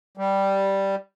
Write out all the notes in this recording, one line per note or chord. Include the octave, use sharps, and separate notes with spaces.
G3